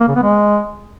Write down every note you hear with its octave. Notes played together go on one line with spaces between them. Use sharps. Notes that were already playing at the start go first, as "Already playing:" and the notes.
A#3
C#3
B3
G#3